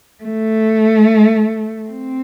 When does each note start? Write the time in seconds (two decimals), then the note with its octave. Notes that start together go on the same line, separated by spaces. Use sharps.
0.24 A3
1.89 C4